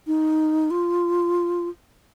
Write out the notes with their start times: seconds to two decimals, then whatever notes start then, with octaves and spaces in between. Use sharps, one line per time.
0.07 D#4
0.71 F4